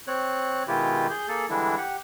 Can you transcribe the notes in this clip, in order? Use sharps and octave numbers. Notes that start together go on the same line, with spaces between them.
C4 C#5 F#6
B2 D#3 G#3 E4 F4 G4
G#4 G6
A#3 G#4 A4
D3 E3 G3 G#3 D4 E4
G4 F#5